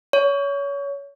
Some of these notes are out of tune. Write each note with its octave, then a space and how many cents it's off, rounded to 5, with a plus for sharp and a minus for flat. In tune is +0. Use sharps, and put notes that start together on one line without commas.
C#5 +25